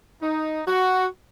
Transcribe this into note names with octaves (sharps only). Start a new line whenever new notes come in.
D#4
F#4